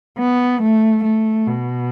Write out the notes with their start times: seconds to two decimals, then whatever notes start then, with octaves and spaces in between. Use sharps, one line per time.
0.18 B3
0.62 A3
1.04 A3
1.47 B2